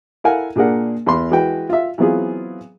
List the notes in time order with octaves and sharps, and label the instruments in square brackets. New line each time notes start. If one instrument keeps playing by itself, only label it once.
[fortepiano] E4 A4 A#4 F5 F#5 G#5
A#2 D4 G#4 A#4 F#5
E2 B5 C6
E3 G#3 F#4 B4 G5
F4 E5
E3 F#3 B3 C4 F4 G#4